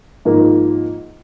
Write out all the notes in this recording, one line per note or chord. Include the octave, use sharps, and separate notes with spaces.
G#2 F3 A#3